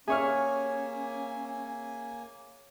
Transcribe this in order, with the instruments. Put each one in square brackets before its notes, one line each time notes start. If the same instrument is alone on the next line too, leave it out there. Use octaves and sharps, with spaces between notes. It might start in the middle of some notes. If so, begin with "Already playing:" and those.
[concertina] A#3 G#5 [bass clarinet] C#4 [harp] G#4 C#5 [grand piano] E5 C#6 F6